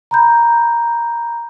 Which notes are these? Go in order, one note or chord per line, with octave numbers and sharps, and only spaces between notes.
A#5 B5 G6